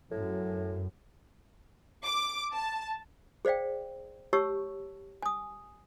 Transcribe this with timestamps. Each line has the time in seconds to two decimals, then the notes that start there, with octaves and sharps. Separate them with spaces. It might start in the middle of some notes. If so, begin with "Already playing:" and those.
0.11 F#2 A2
2.06 D6
2.53 A5
3.45 G#4 C5 D5 F5 G5
4.33 G4 C#5 A5 C#6 E6
5.22 G#5 D#6